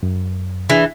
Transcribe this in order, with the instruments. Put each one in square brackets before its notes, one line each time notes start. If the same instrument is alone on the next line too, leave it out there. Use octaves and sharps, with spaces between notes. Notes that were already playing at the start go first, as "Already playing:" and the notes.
[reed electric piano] F#2
[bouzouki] E3 [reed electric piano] D4 G#4